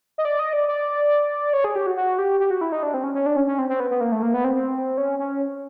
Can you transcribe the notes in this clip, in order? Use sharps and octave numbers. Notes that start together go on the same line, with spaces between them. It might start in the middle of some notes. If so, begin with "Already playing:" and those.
D#5
D5
D#5
D5
D5
C#5
G#4
G4
F#4
F#4
G4
G4
F#4
E4
D#4
D4
C4
C#4
C#4
D4
C#4
C#4
C4
C4
B3
B3
A#3
A3
A#3
B3
C4
C4
C#4
C#4